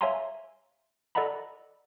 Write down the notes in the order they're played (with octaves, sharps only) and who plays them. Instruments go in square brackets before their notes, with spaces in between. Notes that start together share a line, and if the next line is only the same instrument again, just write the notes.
[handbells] C#5 E5 F5 G#5 A#5 C6
A4 D5 D#5 F#5 A#5 B5